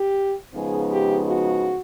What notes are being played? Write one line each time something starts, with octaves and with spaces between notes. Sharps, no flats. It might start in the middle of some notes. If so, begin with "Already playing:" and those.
Already playing: G4
C#3 F3 G#3 B3 D#4 G#4
G4
F#4